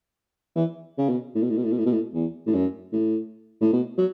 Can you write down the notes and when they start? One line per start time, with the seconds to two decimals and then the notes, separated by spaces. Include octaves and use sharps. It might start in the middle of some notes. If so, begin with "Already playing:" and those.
0.56 E3
0.98 C#3
1.09 B2
1.35 A2
1.42 B2
1.50 A2
1.57 B2
1.64 A2
1.72 B2
1.78 A2
1.86 B2
1.93 A2
2.14 E2
2.47 A2
2.54 F#2
2.93 A2
3.61 A2
3.73 B2
3.98 F#3